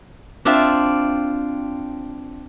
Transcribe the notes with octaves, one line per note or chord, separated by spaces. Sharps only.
C4 D4 F4 E5 A5